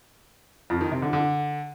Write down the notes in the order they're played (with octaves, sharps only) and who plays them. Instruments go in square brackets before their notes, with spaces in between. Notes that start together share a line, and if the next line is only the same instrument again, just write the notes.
[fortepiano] F2
D#3
C3
D3
D3